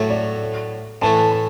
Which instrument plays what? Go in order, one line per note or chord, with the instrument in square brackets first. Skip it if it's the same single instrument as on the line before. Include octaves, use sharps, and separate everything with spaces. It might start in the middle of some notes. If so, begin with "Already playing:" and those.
Already playing: [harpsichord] A2 F#3 A3 F#4 [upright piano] E5
[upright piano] D5
[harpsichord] A2 E3 A3 [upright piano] A5
[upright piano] A5